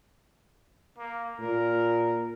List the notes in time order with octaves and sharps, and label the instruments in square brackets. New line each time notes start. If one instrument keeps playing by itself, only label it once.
[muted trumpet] A#3
[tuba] A#2 [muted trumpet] A#4